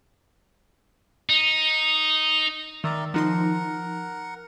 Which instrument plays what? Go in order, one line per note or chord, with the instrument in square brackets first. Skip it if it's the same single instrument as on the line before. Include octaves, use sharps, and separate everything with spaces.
[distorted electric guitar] D#4
[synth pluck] D#3 [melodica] A#4 D5 E5
[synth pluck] F3 D#4 C6 [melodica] A#4 F#5